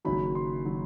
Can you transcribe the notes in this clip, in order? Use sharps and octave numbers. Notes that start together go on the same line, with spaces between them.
F#1 F#2 D#3 F#3 B5
C6
D#3 F#3